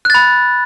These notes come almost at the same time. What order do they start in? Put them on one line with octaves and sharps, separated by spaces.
F#6 A6 B5